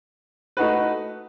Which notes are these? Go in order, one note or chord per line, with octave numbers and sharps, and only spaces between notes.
A3 D#4 F#4 B4